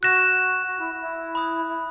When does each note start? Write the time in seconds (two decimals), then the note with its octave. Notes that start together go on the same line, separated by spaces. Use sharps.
0.03 F#4 F#6 A#6 E7
0.69 F#4
0.80 E4
1.02 E4
1.35 B5 D#6 F#6
1.68 E4